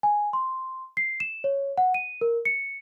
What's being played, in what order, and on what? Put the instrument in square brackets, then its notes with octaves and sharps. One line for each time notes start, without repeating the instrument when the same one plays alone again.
[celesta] G#5
C6
C7
E7
C#5
F#5
D#7
A#4
C#7